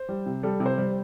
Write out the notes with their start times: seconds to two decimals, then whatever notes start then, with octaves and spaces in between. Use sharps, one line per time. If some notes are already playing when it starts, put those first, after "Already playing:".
Already playing: C5
0.09 G3
0.26 C3
0.43 G3 A4
0.60 C3
0.66 C5
0.78 G3